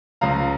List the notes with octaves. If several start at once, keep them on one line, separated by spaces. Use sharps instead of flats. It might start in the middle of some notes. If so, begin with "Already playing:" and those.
C#2 C#3 F3 F5 A#5